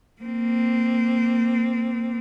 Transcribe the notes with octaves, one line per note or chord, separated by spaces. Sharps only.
A#3 C4